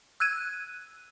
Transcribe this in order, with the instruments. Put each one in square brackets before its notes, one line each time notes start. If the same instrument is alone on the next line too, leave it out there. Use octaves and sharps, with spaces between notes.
[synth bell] E6 F#6 G#6 D#7